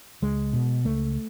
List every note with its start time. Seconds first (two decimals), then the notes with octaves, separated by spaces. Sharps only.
0.22 C#2 G#3
0.53 B2
0.85 C#2 A3